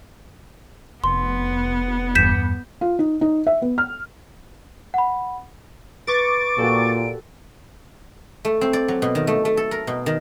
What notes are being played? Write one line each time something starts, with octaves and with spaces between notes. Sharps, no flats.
F1 B3 C6
E2 G2 G6 B6 E7
F4
D#4
D#4
E5
B3
F6
F#5 B5
B4 C#6 D6 A6 D7
A#2 F#4 G4 A4
A3
C4
D5
F#3
B2
D#3
A3
A3
A4
A#4
B2
D#3